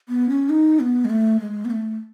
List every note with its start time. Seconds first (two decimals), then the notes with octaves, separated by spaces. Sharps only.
0.09 B3
0.29 C#4
0.49 D#4
0.80 B3
1.05 G#3
1.10 A3
1.40 G#3
1.65 B3
1.70 A3